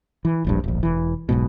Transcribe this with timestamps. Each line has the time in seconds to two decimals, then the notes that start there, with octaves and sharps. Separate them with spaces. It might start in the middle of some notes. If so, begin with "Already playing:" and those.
0.25 E3
0.45 E1 A#1 G2
0.64 D1 A#1
0.83 E1 E3
1.29 E1 B1 G#2 B2